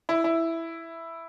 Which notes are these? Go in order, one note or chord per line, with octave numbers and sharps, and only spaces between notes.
E4
E4